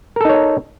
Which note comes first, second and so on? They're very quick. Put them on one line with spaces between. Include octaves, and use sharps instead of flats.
A#4 A4 D#4 C#5